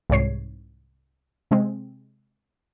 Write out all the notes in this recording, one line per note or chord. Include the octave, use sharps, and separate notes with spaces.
C2 G#2 C#5 C7
C3 G#3 C4